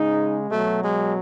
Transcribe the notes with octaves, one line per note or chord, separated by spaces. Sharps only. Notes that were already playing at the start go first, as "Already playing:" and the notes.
Already playing: C#3 G#3 D#4
B2 F#3 A3
G#3